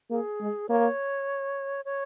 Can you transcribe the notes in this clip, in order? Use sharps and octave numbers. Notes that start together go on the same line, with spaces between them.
A#3 G#4
G#3
A#3 C#5
C#5